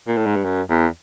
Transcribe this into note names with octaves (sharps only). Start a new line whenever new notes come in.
A#2
A2
G#2
G2
F#2
E2